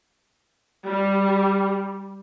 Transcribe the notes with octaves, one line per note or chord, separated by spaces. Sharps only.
G3